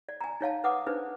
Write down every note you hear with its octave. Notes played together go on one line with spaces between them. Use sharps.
D5
G#5 A#5
D#4 C#5 F5 A5
B4 F#5 D6 D#6
D4 D#4 B4 C5